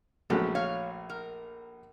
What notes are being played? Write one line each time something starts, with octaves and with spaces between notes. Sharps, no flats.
A#1 F#3 G#3 A3 B3 C#4
C#5 F5
A#4